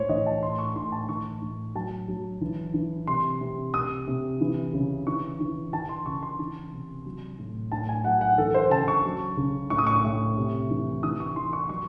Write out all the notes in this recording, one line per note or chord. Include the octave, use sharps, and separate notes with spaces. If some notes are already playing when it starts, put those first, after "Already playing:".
Already playing: A2 C5 C#5
E3 D#5
A5
A2 C6
C#6
A2 C6
A5
E3 C#6
A2
F#3 A5
F#3
E3
E3
C3 C6
C3
C3 D#6
C3
E3
C#3
E3 C#6
E3
E3 A5
C6
C#3 C#6
C6
E3
C3
F#3
A2
A2 A5
G#5
F#3 F#5
F#5
E3 A4
C5
C#3 A5
C#6
F#3
C#3
A2 C#6
D#6
C#6
A2
C3
E3
E3 D#6
C#6
E3 C6
C#6
F#3 C#6